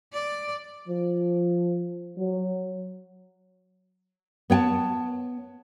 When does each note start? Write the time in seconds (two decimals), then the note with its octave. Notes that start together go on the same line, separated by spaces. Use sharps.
0.13 D5
0.88 F3
2.17 F#3
4.50 B3 C#5 G5 A5